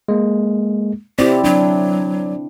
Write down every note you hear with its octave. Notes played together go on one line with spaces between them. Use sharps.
G#3 A#3
C4 E4 G4 D5
F#3 D4